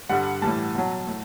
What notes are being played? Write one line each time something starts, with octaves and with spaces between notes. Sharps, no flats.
G2 D3 G3 F#5
A2 E3 G3 A5
B2 F#3
A2